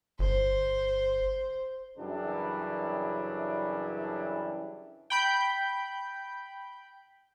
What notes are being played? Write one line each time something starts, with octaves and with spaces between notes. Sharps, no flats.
G1 C5
F#2 C#3 E3 G3 D4 E4
G5 B5 G6